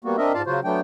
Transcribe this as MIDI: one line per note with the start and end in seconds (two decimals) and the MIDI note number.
0.04 0.16 55
0.04 0.16 58
0.04 0.16 59
0.04 0.16 66
0.18 0.33 60
0.18 0.33 62
0.18 0.33 70
0.18 0.33 75
0.18 0.33 76
0.34 0.42 44
0.34 0.42 65
0.34 0.42 74
0.34 0.42 77
0.34 0.42 81
0.46 0.60 49
0.46 0.60 54
0.46 0.60 65
0.46 0.60 66
0.46 0.60 72
0.64 0.81 54
0.64 0.81 57
0.64 0.81 59
0.64 0.81 62
0.64 0.81 79